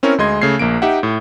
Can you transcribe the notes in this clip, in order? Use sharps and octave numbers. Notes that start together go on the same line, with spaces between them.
C4 C#4 E4 A#4 C#5
D2 G#3 D#5 C6 G#6
C#3 A3 G#6 C7
A#1 A#3 D7
D#4 G4 E5 F#5
A2